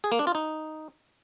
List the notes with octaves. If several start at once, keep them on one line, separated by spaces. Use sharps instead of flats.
G#4
A#3
D4
F4
D#4